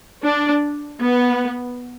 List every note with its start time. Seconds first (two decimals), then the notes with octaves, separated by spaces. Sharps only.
0.24 D4
1.02 B3